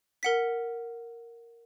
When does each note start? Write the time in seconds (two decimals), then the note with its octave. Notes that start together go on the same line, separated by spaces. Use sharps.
0.23 A#4 F#5 B6